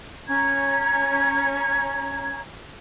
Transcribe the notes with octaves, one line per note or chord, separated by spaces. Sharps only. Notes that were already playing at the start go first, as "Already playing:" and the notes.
C#4 A#5 G#6